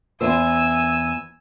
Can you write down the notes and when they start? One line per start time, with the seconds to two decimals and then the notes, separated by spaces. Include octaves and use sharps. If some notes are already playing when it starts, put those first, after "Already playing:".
0.21 E2 C5 G#5 E6